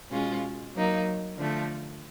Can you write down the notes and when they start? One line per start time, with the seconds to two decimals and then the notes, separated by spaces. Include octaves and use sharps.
0.11 B2 G#3 C#4 F4
0.75 F#3 A#3 D#4
1.37 D3 F3 A3